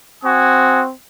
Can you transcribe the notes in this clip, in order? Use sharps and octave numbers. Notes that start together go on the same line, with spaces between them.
C4 F#4 G#5 D#6